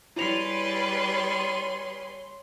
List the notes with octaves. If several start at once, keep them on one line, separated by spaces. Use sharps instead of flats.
G3 E4 G#4 B4 C#5 C6 F7